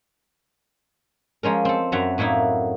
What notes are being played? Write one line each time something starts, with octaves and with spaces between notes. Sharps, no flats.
F3 G#3 C#4 A#4
C4 A4
F#2 F#3 E5 A#5
A2 F#3 A#3 D#4 E4